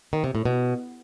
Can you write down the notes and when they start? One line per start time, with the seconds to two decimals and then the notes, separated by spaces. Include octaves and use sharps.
0.13 D#3
0.24 C3
0.35 A2
0.45 B2